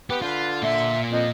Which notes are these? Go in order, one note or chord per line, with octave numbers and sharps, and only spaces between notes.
B3 G4
D3 F4 B4
A#2 E5 C6
F2 D#5